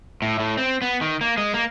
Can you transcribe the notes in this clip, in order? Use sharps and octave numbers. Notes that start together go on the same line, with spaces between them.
A2
A2
C4
B3
D#3
A#3
G#3
A#3